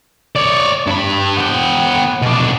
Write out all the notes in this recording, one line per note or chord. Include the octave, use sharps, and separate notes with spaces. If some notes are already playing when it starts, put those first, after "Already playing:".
C#5 D5
G2 B5
B3 G5
B2 D4